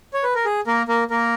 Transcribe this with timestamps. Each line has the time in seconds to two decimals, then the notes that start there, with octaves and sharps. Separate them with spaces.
0.14 C#5
0.23 B4
0.35 A#4
0.45 G#4
0.67 A#3 A#4
0.88 A#3 A#4
1.10 A#3 A#4